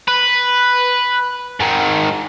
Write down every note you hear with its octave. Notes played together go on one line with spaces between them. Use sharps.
B4
G#2 D#3